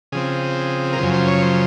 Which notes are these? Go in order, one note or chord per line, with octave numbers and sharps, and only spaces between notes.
C#3 F3 C4 G#4
A#4
F#2 C#3 F3 C5
C5
C#5
C5